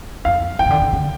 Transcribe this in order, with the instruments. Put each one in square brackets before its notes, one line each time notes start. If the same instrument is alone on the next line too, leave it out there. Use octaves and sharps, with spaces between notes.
[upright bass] F2 [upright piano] F5
[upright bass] F2 [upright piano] G5
[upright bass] C3
D3
D3
D3